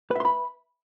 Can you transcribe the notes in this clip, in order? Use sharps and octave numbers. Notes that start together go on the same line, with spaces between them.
B4 E5 B5 C6